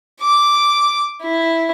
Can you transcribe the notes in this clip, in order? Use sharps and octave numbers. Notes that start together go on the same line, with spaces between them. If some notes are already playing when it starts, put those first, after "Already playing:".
D6
E4